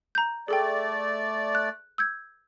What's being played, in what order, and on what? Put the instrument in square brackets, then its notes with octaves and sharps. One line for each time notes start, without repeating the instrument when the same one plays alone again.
[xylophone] A#5 G6
[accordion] A3 D5 [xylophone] G#4 A4 G5
[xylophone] F#6
E6 G6 G#6